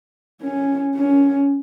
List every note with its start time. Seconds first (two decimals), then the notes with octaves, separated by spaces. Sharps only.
0.41 C#4
0.95 C#4